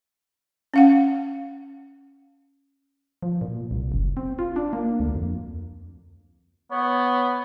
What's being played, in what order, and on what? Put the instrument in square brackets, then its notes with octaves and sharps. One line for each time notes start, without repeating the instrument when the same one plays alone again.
[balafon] C#4 F5 F#5
[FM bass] F3
A#2
C2
F#1
C4
F4
D4
A#3
D2
F2
[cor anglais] B3 [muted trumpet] C#5